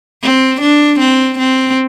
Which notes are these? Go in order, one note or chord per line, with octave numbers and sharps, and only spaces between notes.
C4
D4
C4
C4